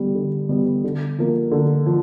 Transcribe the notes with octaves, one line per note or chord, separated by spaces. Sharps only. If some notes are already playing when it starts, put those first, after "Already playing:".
Already playing: D3 G3 B3
D3
G3 B3
D3
F3 A#3
D3
F3